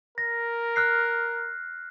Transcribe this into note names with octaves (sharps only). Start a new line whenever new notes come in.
A#4 A#6
F6 F#6 C7